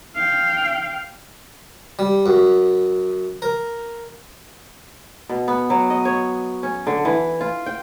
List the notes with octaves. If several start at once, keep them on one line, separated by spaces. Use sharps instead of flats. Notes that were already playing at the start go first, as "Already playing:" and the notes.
F5 G5
G3
F#2
A#4
B2
B3
F#3
D#5
C#5
C#4
D3
E3
F4
G5